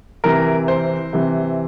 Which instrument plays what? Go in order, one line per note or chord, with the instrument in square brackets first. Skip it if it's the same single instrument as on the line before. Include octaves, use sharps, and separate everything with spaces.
[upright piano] C3 E3 A#4
C5
C3 E3